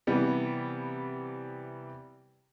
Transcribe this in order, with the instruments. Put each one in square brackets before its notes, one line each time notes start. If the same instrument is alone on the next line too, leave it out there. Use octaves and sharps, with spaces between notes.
[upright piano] C3 E3 G3 B3